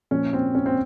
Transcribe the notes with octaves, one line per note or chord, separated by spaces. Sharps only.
A#2 F3 C#4
C4
C#4
C4